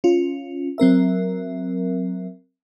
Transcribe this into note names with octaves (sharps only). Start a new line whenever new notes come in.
C#4 F4
F#3 C4 A#4 E5